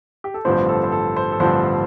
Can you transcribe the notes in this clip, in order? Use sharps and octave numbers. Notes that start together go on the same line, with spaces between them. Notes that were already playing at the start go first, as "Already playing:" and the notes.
G4
A4
A1 G2 D3 F3 C4 C5
A4
C5
A4
C5
A4
A1 G2 D3 F3 C4 C5